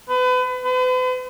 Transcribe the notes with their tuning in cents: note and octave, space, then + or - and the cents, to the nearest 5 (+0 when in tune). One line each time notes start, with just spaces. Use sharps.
B4 +35
B4 +45